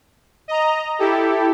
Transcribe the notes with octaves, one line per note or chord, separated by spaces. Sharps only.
D#5 A#5
E4 G4 A4